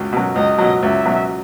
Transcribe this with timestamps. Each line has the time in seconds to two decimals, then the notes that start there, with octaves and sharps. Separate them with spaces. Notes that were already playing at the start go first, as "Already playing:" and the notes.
Already playing: C#2 B2
0.13 B2 F#3
0.36 C#2 D#5
0.58 B2 F#3
0.83 C#2 E5
1.05 B2 F#3